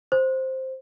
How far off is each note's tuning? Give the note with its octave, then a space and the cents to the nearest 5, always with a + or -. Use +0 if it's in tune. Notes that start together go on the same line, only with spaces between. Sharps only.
C5 +5